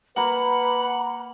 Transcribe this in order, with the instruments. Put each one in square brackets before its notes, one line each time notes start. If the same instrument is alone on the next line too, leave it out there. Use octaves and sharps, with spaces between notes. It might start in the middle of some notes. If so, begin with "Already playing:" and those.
[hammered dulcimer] A#3 A#5 [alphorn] B4 [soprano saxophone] F#5 [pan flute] B5